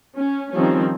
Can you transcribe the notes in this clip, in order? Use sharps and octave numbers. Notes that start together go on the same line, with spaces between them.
C#4
D#3 F3 G3 C4 C#4